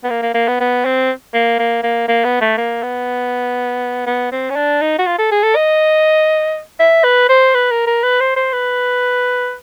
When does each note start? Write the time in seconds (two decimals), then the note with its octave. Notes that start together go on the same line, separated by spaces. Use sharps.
0.04 B3
0.10 A#3
0.22 A#3
0.34 A#3
0.48 B3
0.60 B3
0.85 C4
1.34 A#3
1.59 A#3
1.83 A#3
2.08 A#3
2.25 B3
2.41 A3
2.58 A#3
2.83 B3
4.06 B3
4.32 C4
4.51 C#4
4.56 D4
4.82 D#4
4.99 F#4
5.07 F4
5.18 A4
5.32 G#4
5.43 A4
5.56 D#5
6.80 E5
7.04 B4
7.29 C5
7.55 B4
7.71 A#4
7.87 A#4
8.04 B4
8.21 C5
8.36 C5
8.53 B4